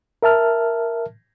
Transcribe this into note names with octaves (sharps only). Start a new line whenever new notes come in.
A#4 E5 A5 F6